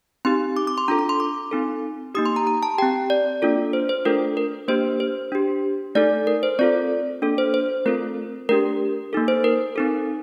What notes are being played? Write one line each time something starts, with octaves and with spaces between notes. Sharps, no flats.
C4 D#4 G4 C6
D6
D6
C6
D4 F4 A4 A#5
D6
C6
D6
C4 D#4 A4
A#3 D#4 G4 D#6
C6
A#5
A#5
A5
C4 G4 G5
D5
A#3 D4 F4 A4
C5
C5
A3 D4 F4 A4 A#4
A#4
A#3 D4 G4 C5
C5
D4 G4
A3 D#4 A4 D5
A#4
C5
C4 F4 A4 D5
A#3 D4 A4
C5
C5
A3 C4 F4 A4 A#4
A3 D4 G4 A#4
A#3 D#4 A4
C5
A#4
C4 D#4 A4